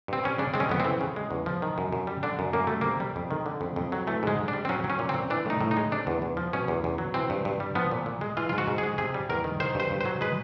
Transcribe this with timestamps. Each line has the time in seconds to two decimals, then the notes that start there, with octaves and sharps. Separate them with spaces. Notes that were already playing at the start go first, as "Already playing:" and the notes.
0.08 G2 C4
0.24 G3 C#4
0.38 C#3 D4
0.54 G#3 C4
0.60 C#4
0.69 F2 B3
0.80 E3 C4
1.01 C#3
1.16 G#3
1.31 E2
1.46 F3
1.62 D#3
1.78 F#2
1.92 F#2
2.07 G3
2.23 D3 D4
2.39 F#2
2.53 F#2 A#3
2.67 G3 A3
2.81 C3 A#3
3.00 G3
3.16 F2
3.31 D#3
3.46 D3
3.61 F2
3.76 F2
3.92 F#3
4.07 E3 A3
4.23 G#2 G#3
4.39 G#2
4.48 D4
4.53 G3
4.65 C4
4.69 F#3 C#4
4.84 F#3
4.90 C#4
4.99 A#2
5.09 C4
5.14 A#2
5.30 E3 D4
5.46 A2 D#4
5.61 A2
5.71 D#4
5.77 G#3
5.92 C3 D4
6.07 E2
6.22 E2
6.37 F3
6.53 B2 C#4
6.68 E2
6.84 E2
6.98 F#3
7.14 E3 C4
7.30 G2
7.45 G2
7.60 G3
7.75 F3 B3
7.91 A#2
8.06 A#2
8.21 G#3
8.37 E3 F4
8.49 F4
8.53 G#2 F#4
8.67 G#2
8.78 G#4
8.83 G#3
8.98 C3 G#4
9.14 G3
9.29 E2 A#4
9.44 D#3
9.60 D#3 C5
9.75 G2 C5
9.91 G2
10.01 F#3 C5
10.21 G#3 B4